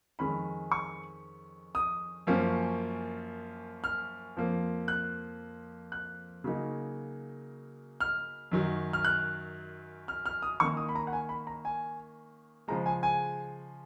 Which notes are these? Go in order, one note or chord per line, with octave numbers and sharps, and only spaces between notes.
F2 D#3 G#3 C#4 B5
C#6
D#6
F#2 F3 A#3 C#4
F6
F2 F3 A#3
F#6
F#6
C#3 F#3 A#3 D#4
F6
F#2 D#3 F#3
F6
F#6
F6
F6
D#6
D#3 A#3 C#4 C#6
D#6
B5
A#5
F#5
G#5
B5
A#5
G#5
C#3 F3 G#3 A#5
G#5
G#5